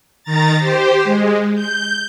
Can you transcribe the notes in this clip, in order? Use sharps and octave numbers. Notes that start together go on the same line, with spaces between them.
D#3 A#5 A6
G4 C5
G#3
G6